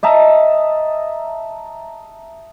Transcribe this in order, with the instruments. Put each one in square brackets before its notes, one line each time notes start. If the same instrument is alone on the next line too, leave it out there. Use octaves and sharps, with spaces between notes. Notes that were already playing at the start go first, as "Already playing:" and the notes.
[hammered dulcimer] D#5 E5 A5 A#5